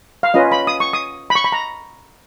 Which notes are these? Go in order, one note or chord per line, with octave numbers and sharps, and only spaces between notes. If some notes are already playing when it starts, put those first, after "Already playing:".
F5
C#4 F4 B4 D#5
B5
D#6
C#6
D#6
B5
C#6
B5
A#5